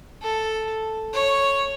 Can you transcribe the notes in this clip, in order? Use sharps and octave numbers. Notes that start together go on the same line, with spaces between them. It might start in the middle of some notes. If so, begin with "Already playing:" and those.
A4
C#5